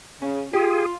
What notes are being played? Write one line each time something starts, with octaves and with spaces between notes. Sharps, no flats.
C#3 C#4
F4 G4 G#4